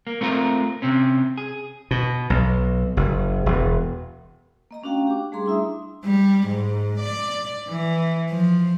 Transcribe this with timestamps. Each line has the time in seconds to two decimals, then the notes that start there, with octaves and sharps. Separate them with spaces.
0.07 A#3
0.21 A3 C4 F4 A#4
0.82 C3 C4 C#4
1.38 G#4
1.91 B2
2.30 B1
2.97 F#1
3.46 E1
4.71 A#3 D#5 A#5
4.83 A3 C#4 D4 F#4 F5 G5
5.07 G4 D6
5.32 G3 A3 G#4 A#5 C6
5.46 D4 E4 E5 D#6
6.05 G3
6.48 G#2
7.01 D5
7.68 E3
8.30 F3